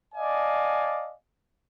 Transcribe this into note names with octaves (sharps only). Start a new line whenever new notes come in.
D5 D#5 F5 G#5 A5